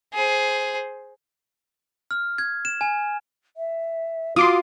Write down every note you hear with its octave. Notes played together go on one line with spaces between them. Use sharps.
G#4 C5
F6
G#6
E7
G#5
E5
F4 F#4 C6 D6 D#6